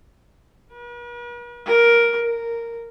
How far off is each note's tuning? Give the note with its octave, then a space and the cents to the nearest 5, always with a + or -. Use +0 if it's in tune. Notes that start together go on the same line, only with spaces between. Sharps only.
B4 -45
A#4 +10
A#4 -5